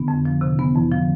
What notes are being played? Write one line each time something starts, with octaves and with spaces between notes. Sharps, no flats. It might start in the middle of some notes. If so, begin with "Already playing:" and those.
Already playing: D3 B3
F2
F3
C3
D3 B3
F2 E3
D3 F3